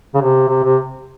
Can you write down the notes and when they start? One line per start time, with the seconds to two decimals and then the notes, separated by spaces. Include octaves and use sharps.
0.14 C#3
0.21 C3
0.48 C3
0.64 C3